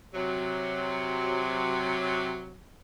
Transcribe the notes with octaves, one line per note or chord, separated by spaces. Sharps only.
C3 F#3